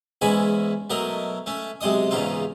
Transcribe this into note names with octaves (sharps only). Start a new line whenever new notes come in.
E2 G#2 E3 C#4 G#5 B5
B1 F#3 A3 A#4 D#5
A3 C#4
B1 C3 G#3 D#5 D#6
E2 G#2 C#3 D#4 F4